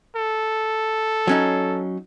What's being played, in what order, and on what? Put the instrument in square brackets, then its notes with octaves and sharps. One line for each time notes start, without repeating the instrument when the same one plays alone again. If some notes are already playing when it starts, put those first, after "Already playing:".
[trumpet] A4
[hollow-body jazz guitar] F#3 C#4 D#4